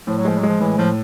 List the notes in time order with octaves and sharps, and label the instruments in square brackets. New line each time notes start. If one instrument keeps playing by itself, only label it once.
[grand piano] A2 [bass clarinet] F3
[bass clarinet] F#3
[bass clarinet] F3 [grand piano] G#3
[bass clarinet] F#3
[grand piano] G#3
[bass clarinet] F3
[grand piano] A2 [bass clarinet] E3
[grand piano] A2 [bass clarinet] F3